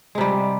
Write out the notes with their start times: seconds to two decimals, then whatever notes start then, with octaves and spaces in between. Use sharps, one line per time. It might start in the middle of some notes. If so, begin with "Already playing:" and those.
0.15 G#3
0.18 C3
0.21 G3